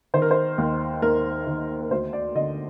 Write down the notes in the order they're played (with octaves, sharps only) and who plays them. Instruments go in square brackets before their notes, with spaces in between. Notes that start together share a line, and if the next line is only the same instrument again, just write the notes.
[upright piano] D#3 C5
A#4
C5
D#2
D#2 A#4
D#3
A#4
D2 C5
D5
D3 D#5